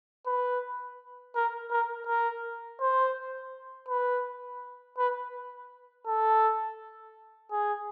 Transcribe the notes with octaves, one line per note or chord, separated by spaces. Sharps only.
B4
A#4
A#4
A#4
C5
B4
B4
A4
G#4